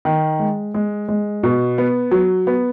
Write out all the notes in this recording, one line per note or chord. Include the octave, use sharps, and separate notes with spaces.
D#3
G#3
G#3
G#3
B2
B3
F#3
B3